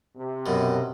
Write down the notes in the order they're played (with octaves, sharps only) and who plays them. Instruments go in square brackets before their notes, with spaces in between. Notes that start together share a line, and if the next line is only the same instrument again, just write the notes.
[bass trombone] C3
[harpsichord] F#2 B2